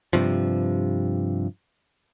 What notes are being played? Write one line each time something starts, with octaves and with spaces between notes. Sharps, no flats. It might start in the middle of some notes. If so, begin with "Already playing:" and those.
G2 C3 F3